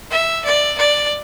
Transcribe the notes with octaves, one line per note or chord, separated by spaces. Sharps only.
E5
D5
D5